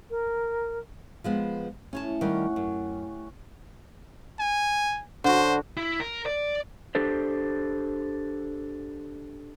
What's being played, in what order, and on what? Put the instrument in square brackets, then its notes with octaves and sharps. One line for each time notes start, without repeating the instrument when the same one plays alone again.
[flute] A#4
[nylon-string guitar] F3 G#3 B3
[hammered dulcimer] A2 [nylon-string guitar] C#4 C#5 A5
[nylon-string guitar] D#3 G3 [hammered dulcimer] C#4 G4 F#5
[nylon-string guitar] F#2 [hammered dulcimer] C#4
[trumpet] G#5
[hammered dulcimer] D3 F#4 [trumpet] C5
[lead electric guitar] E4
A#4
D5
[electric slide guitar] D4 G4 A4 C5